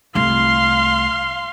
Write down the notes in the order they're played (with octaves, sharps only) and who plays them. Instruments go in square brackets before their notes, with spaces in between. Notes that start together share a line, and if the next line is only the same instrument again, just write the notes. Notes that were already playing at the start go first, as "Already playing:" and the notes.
[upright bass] C2 A3 [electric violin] F5 C6